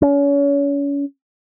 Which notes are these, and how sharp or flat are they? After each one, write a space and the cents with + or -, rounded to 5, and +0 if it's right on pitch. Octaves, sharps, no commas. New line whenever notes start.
C#4 +35